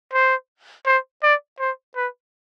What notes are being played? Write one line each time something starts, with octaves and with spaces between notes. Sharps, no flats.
C5
C5
D5
C5
B4